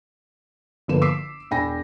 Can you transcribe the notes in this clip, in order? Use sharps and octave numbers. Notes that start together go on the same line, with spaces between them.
G1 D3 F3 A#3 B4 E7
D6 E6 B6 C7 E7
E1 D4 G5 G#5 B5 A#6